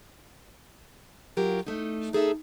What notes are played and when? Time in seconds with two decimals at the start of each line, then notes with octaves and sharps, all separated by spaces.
1.37 F#3 F4 G4 A#4
1.67 A3 D#4
2.13 D#4 G#4 A4 E5